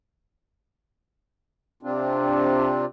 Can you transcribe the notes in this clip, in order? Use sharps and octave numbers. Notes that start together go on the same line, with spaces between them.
C3 C4 D4 F4